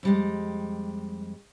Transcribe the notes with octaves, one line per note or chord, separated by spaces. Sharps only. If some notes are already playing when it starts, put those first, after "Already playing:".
F2 G3 G#3